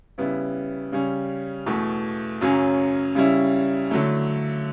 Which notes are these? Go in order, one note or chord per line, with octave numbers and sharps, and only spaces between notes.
C#3 G3 B3 E4
C#3 G3 C#4
E2 B2 A3
F#2 C#3 F#3 C#4
C#3 G3 C#4 E4
D3 F#3 A3 E4